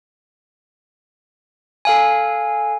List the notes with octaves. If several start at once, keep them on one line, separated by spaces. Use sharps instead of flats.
A4 F5 G#5